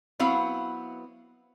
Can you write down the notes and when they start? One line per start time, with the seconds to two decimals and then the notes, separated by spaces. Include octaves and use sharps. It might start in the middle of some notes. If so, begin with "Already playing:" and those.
0.19 F#3 B3 C4 E4 B4 F5